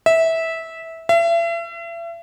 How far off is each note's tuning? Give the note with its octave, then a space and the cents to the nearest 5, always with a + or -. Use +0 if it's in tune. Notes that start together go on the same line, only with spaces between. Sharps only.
E5 -15
E5 +40